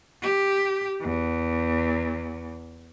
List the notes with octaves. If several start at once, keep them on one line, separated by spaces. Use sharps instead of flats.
G4
E2